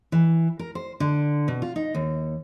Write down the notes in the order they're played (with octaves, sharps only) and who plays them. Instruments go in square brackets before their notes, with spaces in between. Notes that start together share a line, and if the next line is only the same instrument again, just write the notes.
[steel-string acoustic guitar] E3
A#4
C5
D3
B2
F4
D#4
D#2